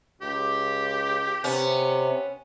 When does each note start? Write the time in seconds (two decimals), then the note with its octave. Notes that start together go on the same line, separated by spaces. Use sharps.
0.22 C#2 G4
1.44 C3 B3 C#4